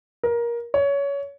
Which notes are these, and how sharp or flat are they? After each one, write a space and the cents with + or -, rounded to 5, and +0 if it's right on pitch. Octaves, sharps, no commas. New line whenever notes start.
A#4 +20
C#5 +20